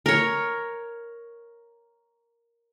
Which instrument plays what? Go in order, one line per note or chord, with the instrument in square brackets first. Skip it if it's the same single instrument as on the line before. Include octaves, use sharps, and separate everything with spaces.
[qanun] A#4 C#5